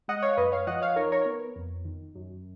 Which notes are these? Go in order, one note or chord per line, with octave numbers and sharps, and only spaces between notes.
G#3 D#5 F#5
C#5 F5
F#2 B4 D#5
C#5 F5
F3 D#5 F#5
C#5 F5
D#4 A#4 C#5
A#4 C#5
B3
F2
D#3
F#2